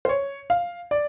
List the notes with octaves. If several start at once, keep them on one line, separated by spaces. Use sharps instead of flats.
C5
C#5
F5
D5